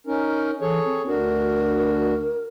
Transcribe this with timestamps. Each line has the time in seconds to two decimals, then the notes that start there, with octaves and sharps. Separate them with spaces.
0.07 C#4 D#4 A#4
0.61 E3 G#4 A4 C#5
0.85 C4
1.07 D2 D4 F#4 A#4